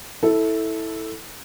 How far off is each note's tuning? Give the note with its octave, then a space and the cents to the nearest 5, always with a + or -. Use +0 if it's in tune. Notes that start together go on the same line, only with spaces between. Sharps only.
E4 -15 A4 +0